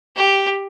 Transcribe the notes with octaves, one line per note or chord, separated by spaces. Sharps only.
G4